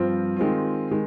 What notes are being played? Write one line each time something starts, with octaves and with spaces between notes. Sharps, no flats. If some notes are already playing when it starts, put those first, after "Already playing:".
Already playing: G2 F3 C4 F4
D#3 G#3 C4 F4
D#3 G#3